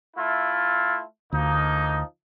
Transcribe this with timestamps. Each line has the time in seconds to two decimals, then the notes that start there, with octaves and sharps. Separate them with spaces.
0.17 A3 E4 F4
1.32 D2 F3 A#3 D#4